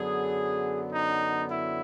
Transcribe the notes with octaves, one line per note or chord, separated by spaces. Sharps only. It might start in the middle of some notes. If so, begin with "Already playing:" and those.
Already playing: F#2 D3 F#3 B3 G#4
D#4
E4